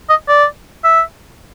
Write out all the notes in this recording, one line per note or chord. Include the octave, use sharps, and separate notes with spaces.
D#5
D5
E5